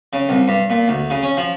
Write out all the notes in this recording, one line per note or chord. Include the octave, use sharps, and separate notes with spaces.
C#3
C2
G2
A#2
D2
C#3
C#4
F3